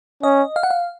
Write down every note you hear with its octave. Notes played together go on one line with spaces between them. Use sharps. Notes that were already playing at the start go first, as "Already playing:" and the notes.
C#4 D#5
F5
F#5
F5